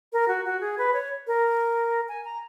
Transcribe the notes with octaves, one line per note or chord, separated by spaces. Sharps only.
A#4
F#4
F#4
G#4
B4
C#5
A#4
G#5
A#5